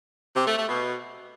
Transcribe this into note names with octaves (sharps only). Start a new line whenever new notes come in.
C3
A3
A3
B2